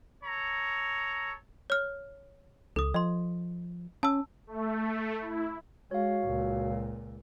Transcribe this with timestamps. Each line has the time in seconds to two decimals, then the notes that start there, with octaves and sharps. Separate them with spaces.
0.23 A4 C#5 A#5
1.70 C#5 F6
2.76 C#2 A4 D#6
2.94 F3 D#5 C6
4.03 C#4 A5 E6
4.47 A3
5.21 E4
5.91 G#3 F#4 C#5 F5
6.24 C#2 A#2